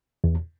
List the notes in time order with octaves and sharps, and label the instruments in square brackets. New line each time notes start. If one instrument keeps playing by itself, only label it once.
[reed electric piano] E2